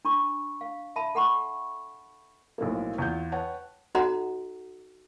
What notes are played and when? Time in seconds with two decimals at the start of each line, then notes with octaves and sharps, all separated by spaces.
0.05 D4 B5 C#6
0.61 F5
0.96 E5 A5 B5
1.15 A4 F#5 B5 C#6
2.58 B1 A2 F3 A#3
2.98 E2 F4 G6
3.32 B4 C#5 F#5 G5 A5
3.95 D#4 F#4 A4 D#5 F#5 A#5